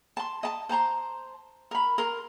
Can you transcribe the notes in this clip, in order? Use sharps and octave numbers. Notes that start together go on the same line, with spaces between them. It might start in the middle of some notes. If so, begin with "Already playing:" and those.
A5 C6
D#5 A5
C5 A5 A#5 C6
A#4 B5
A#4 C6